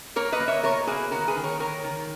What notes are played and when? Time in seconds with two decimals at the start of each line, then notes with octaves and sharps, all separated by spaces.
0.16 A#3 A#4 C#5
0.32 B4 D#5
0.40 A#3
0.48 C#5 E5
0.63 B2 A#4 C#5
0.87 A#3 G#4 B4
1.11 D#3 F#4 A#4
1.28 G#4 B4
1.36 D#3
1.44 A#4 C#5
1.60 D#3 A#4 C#5
1.84 D#3